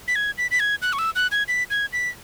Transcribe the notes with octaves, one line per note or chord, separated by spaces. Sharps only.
B6
G#6
B6
B6
G#6
F#6
C#6
E6
F#6
G#6
B6
G#6
B6